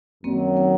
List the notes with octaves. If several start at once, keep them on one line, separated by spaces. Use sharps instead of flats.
F#2 D#3 F#3 A#3 C4
C4